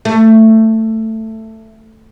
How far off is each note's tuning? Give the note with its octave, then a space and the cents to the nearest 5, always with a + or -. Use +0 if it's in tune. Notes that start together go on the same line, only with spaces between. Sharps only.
A3 +10